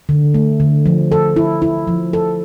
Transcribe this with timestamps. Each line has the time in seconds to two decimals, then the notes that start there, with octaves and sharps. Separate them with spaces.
0.09 D3
0.34 A3
0.60 D3
0.86 F3
1.12 A4
1.36 E4
1.62 E4
1.87 F3
2.13 A4